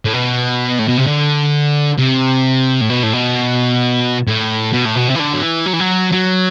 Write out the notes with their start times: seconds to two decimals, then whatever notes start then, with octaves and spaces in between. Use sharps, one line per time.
0.05 A2
0.13 B2
0.79 A2
0.88 B2
0.97 C3
1.06 D3
1.98 C3
2.81 A2
2.89 B2
3.03 A2
3.13 B2
4.28 A2
4.73 B2
4.86 A2
4.96 B2
5.09 C3
5.15 E3
5.20 D3
5.33 F#3
5.43 E3
5.66 F#3
5.73 E3
5.80 F#3
6.12 F#3